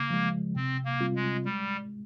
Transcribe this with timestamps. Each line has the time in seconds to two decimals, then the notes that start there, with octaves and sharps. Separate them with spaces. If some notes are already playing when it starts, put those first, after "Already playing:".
Already playing: C#3 A#3
0.10 F3 G#3
0.56 C3 C4
0.85 A#3
1.01 G3 C4 F4
1.15 G#3
1.45 G3 G#3